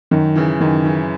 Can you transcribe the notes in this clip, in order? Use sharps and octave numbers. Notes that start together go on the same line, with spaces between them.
F#2 D#3
C#3 E3
F#2 D#3
C#3 E3